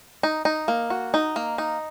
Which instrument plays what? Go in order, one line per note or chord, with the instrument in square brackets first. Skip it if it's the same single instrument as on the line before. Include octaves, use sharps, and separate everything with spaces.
[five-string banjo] D#4
D#4
A#3
F#4
D#4
A#3
D#4